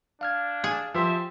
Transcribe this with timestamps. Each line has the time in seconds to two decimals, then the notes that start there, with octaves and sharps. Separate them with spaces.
0.21 D4 F5 F6 G#6
0.64 G#4
0.94 F3 G4 C5 E5